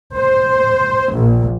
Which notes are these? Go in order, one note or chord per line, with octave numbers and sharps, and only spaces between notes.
C5
A#1